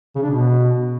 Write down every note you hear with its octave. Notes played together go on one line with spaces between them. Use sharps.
C#3
D4
B2